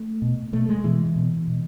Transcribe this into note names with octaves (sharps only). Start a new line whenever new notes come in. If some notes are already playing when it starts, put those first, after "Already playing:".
Already playing: A3
B2
B2 A3
G#3
B2 E3
B2
B2